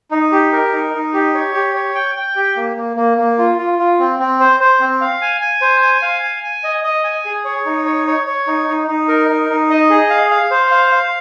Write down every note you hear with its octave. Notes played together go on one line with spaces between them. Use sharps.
D#4
G4
A#4
D#4
D#4
G4
C#5
G4
C#5
G5
G5
G4
A#3
A#3
A#3
A#3
F4
F4
F4
C4
C4
C5
C5
C4
F5
G#5
G#5
C5
G#5
F5
G#5
G#5
D#5
D#5
G#5
G#4
C#5
D#4
C#5
C#5
C#5
D#4
D#4
D#4
A#4
D#4
D#4
D#5
G#4
F5
F5
C5
F5
F5